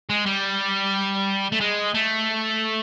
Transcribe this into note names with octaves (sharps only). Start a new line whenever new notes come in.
G#3
G3
A3
G#3
A3